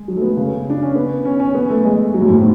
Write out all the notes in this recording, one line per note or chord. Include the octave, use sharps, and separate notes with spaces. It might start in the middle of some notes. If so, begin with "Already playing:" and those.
Already playing: G#3
F#3
A3
B3
C#3
D4
C#4
B3
C#4
C#4
B3
A3
G#3
F#3
A2
G#2
B2